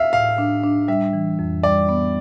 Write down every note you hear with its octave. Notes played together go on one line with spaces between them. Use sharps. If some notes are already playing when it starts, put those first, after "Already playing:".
Already playing: E5 F5
A2 F5
D4
D4
G3 E5
E3
F2
G3 D5
B3